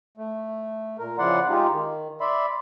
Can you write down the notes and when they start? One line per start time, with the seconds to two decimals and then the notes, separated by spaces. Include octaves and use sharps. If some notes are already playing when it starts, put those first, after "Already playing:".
0.17 A3
0.99 A#2 A#4
1.19 C#3 F3 E4 D5 F#5 C6
1.49 G#3 D#4 F4 G4
1.72 D#3
2.21 D5 E5 B5 C6